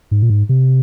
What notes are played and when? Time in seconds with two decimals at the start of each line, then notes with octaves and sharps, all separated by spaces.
0.11 G#2
0.22 A#2
0.30 G#2
0.49 C3